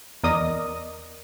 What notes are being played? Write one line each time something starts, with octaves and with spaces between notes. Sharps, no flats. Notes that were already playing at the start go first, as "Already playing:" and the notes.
E2 A#4 D5 D#5 D#6